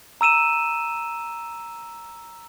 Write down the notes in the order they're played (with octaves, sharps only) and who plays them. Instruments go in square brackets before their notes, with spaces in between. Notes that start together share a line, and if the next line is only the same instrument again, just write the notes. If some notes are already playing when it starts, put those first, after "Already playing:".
[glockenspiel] A#5 E6 D#7 E7